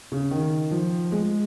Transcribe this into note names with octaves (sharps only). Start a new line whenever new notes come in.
C#3
D#3
F3
G#3